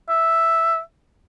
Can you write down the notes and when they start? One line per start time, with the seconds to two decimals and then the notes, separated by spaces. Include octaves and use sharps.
0.09 E5